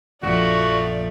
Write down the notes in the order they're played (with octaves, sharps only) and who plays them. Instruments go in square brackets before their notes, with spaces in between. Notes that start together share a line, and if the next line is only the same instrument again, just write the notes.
[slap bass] A#1 F#2 C#3 [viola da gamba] F3 A3 [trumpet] F#4 [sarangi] D5